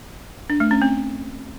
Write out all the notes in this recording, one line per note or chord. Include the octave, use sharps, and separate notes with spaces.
D4
A3
C#4
C4